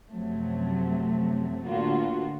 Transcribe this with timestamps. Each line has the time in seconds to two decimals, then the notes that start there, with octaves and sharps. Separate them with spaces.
0.11 F#2 C3 F3 F#3 A3
1.65 A2 D3 A#3 B3 F4 F#4